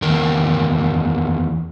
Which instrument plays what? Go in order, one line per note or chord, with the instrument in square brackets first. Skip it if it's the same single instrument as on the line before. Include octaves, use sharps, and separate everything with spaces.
[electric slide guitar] E2 D#3 A#4